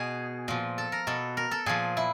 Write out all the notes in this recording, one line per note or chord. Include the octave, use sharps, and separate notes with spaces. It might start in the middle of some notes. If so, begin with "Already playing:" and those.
Already playing: B2 G#4
A#2 F3
A4
A#4
B2 A4
A#4
A4
A#2 F3 G#4
E4